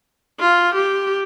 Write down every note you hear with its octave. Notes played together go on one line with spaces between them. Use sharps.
F4
G4